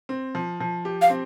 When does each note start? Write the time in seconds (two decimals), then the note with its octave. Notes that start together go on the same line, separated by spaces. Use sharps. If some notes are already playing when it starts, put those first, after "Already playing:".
0.09 C4
0.35 F3
0.60 F3
0.85 G4
1.02 F5
1.10 C4